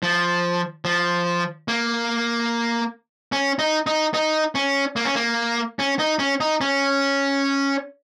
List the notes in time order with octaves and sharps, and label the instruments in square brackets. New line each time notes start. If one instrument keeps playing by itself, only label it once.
[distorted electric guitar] F3
F3
A#3
C#4
D#4
D#4
D#4
C#4
A#3
C#4
A#3
C#4
D#4
C#4
D#4
C#4